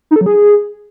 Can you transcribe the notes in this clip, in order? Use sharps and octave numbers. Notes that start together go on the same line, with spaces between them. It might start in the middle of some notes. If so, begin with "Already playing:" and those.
D#4
A4
F#3
G#4